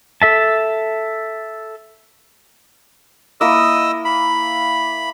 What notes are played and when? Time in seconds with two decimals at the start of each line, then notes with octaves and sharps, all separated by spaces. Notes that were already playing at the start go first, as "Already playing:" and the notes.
0.22 A4 E5 A5
3.41 A#3 E4 D#5 D#6 E6
4.05 B5